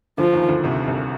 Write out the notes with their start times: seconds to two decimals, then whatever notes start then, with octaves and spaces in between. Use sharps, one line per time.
0.18 D2 D3 F3
0.33 D#2 D#3
0.48 D2 D3
0.64 C2 C3
0.87 C2 C3